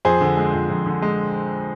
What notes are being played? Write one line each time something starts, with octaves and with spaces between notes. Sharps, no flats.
F2 G#4 C5
D3
G#3
F2
F2
D3
G#3